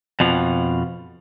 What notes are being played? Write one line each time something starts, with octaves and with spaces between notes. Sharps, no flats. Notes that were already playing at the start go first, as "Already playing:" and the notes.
F2 B2 F3